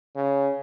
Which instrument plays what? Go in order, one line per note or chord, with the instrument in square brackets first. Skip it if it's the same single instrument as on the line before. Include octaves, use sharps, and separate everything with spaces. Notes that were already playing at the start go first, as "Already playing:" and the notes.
[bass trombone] C#3